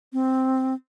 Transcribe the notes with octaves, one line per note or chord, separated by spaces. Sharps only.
C4